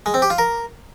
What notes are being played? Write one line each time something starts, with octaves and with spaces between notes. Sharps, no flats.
G#3
C4
G4
F4
A#4